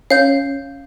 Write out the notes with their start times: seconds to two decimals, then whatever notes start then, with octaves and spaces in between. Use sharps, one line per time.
0.10 C#4 F5 G6